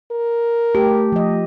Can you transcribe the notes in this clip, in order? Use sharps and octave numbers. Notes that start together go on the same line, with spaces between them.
A#4
A3 G4
F3 D#5